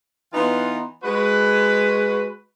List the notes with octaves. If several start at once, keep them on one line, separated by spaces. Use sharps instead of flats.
E3 B3 D#4 F4 B4 C6
G#3 F#4 B4